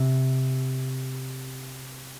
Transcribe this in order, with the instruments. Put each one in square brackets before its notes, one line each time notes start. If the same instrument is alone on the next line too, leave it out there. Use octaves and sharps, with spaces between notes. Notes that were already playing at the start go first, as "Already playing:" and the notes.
Already playing: [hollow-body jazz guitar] C3